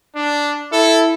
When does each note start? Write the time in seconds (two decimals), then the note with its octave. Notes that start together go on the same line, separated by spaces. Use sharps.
0.16 D4
0.73 E4 A4